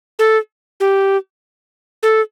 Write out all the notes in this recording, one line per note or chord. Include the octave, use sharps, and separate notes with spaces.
A4
G4
A4